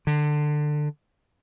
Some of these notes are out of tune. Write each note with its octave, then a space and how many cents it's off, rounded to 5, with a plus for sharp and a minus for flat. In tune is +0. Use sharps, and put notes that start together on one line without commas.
D3 +20